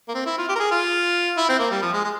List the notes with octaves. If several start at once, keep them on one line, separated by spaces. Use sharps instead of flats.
A#3
C4
E4
F4
G4
A#4
G#4
F4
E4
C4
A#3
G3
F3
G#3
G#3